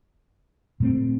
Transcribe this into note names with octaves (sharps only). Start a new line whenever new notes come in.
A#2 A3 C4